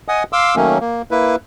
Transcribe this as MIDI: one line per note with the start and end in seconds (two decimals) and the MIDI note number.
0.08 0.23 75
0.08 0.23 78
0.08 0.23 80
0.08 0.23 87
0.33 0.55 77
0.33 0.55 84
0.33 0.55 86
0.33 0.55 88
0.56 0.78 51
0.56 0.78 54
0.56 0.78 57
0.56 0.78 58
0.56 0.78 61
0.80 1.02 58
1.11 1.36 58
1.11 1.36 64
1.11 1.36 71